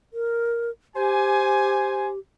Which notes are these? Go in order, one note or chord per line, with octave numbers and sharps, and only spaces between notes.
A#4
G4 C5 G#5